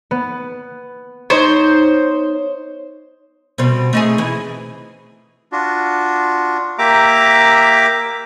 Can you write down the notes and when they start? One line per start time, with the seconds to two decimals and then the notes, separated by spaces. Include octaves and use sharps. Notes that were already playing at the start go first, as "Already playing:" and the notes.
0.11 B3
1.30 D#4 C5 C#5
3.58 B2 G3 C4
3.93 A3 D#4 G#4
4.18 E3
5.52 D4 F4 F#4
6.79 A#3 G4 E5 A#5 D6